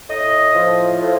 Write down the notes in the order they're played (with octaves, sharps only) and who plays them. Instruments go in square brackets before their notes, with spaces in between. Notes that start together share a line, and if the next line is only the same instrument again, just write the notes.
[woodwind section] A2 D#5
F3
A2